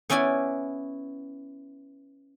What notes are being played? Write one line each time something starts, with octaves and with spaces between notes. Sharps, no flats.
B3 C#4 E4 D5 G#5